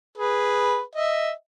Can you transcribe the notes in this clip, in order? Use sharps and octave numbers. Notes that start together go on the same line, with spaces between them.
G#4 B4
D#5 E5